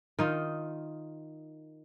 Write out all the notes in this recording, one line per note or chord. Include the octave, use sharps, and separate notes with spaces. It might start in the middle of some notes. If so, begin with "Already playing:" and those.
D#3 D#4 F4